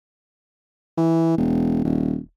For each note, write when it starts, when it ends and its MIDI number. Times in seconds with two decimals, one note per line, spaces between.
0.98 1.34 52
1.37 1.83 28
1.84 2.18 27